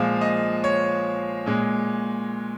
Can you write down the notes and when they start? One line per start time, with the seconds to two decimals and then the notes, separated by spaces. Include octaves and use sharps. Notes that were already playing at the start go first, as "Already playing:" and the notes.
Already playing: A#2 F3 G#3 F5
0.21 D#5
0.64 C#5
1.46 A#2 G#3